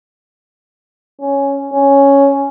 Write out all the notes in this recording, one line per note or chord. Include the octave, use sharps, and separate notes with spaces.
C#4
C#4